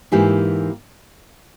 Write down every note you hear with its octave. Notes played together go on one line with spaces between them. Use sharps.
G#2 E3 A#3 E4 G4